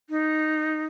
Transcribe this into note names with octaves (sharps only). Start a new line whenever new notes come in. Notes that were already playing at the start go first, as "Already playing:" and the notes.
D#4